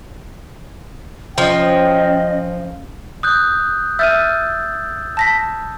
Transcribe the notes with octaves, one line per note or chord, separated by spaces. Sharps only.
F3 C#4 D#5 G5
D#6 F#6 G6
E5 E6 F6 G6 A6 D#7
A5 A#6 B6